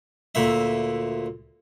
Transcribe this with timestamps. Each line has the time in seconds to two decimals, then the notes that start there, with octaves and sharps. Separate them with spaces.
0.35 D2 A#2 E5